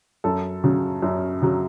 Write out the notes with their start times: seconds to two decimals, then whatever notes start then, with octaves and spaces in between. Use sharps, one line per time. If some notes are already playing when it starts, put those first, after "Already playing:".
0.24 F#2 A4
0.64 C#3 F#3
1.02 F#2
1.42 C#3 F#3